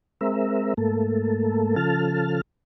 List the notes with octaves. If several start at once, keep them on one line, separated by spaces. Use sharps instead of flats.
G#3 C4 A#4 E5
G#2 A3 A#3 A4
C#3 F3 A4 A5 F6